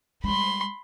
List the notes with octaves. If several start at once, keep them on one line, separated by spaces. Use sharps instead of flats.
G3 G#3 B5 C6